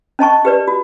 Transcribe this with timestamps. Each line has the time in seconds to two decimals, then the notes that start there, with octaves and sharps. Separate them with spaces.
0.19 C#4 D#5 A5 C#6
0.45 G4 B4 D5
0.68 F#4